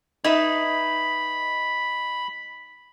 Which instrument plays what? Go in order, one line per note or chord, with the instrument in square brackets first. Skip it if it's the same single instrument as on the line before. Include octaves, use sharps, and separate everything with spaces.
[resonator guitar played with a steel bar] D#4 B4 E5 [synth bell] D#5 [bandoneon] B5